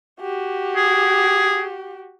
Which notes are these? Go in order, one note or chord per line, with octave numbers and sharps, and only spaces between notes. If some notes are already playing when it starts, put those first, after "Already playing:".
F#4 G4
G#4